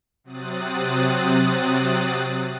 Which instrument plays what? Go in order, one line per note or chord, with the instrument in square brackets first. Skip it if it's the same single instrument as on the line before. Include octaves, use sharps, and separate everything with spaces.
[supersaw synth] C3 F#3 C4 D#6 F#6 A6